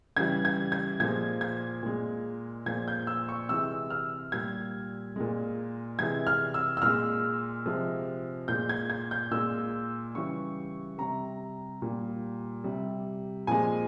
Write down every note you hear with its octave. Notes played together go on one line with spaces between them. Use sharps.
C#3 E3 G3 G#6
G#6
G#6
A#2 F3 G#3 G#6
G#6
A#2 G#3
A#2 F3 G#3 G#6
G6
E6
C#6
C3 E3 G#3 E6
F6
A#2 G3 G#6
A#2 G#3
C3 E3 G#3 G#6
F6
E6
E6
A#2 G#3 F6
C3 F3 G#3
A#2 G#3 G6
G#6
G#6
G6
A#2 G#3 E6
C#3 E3 G3 C#6
C3 G3 A#5
A#2 G3
C3 G3
A#2 F3 G#3 G#5